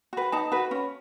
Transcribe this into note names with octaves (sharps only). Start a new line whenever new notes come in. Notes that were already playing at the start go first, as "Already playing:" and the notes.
F#4 B4
D#4 A5
F#4 B4
C#4